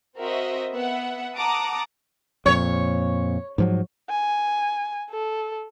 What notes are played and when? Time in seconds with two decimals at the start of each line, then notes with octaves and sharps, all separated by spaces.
0.17 C4 F#4 A#4 C5 D#5 E5
0.71 B3 E5 F#5
1.37 F#5 A5 A#5 D6 D#6
2.46 F2 A#2 C#5
3.58 G#2 F3 F#3
4.10 G#5
5.10 A4